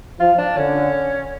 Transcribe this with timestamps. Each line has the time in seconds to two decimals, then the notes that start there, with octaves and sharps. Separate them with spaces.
0.20 F3 F4
0.38 D4
0.57 D3 C#4